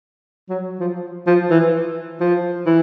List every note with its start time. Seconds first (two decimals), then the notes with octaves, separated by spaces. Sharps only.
0.49 F#3
0.80 F3
1.27 F3
1.51 E3
2.20 F3
2.66 E3